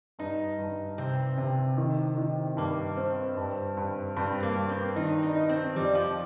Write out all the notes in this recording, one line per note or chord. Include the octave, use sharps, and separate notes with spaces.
G2 D#4
G2
C3 C4
C3
D#3
D#3
G2 A#3
C4
G2
G2
G2 C4
A#3
G2
C4
D#3 D#4
D#4
D#5
C4
F2 G3
F3